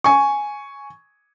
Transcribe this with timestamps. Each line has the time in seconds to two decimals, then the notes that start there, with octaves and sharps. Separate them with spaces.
0.04 G#5 C#6